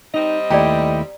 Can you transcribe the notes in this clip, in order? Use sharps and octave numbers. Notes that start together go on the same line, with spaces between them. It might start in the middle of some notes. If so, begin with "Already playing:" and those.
G3 C4 D#4 D#5
D#2 A3 E4 G4 D5 A#5